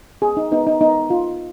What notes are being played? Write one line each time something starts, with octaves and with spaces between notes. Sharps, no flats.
B3 G#4
D#4
B3 D#4
D#4
B3 D#4
B3 F4